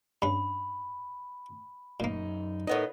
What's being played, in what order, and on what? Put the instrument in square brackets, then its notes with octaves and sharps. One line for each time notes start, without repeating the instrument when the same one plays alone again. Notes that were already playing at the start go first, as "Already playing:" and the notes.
[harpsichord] G2 C#4 [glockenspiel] B5
[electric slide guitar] F#2 D#4 [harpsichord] A#2 A#3
[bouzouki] A2 B3 D#5 [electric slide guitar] D#4 A#4